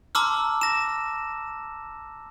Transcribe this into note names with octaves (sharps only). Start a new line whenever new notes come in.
A5 A#5 C6 D6 E6 F6
A#6 E7